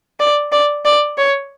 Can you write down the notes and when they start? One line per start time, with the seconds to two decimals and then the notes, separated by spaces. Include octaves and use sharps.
0.20 D5
0.52 D5
0.85 D5
1.18 C#5